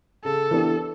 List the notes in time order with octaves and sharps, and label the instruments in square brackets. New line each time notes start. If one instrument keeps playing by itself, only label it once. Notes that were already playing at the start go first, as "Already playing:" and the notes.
[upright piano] C#3 [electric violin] A4
[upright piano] E3 B3 D4 G4